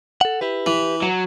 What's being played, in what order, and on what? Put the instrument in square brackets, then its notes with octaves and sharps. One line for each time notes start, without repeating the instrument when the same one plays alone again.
[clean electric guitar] A4 F#5
E4 G4 B4
[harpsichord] E3
[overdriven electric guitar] F#3